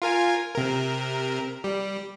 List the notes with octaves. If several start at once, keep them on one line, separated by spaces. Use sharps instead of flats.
F4 A#4 G#5
C3 A#4
G3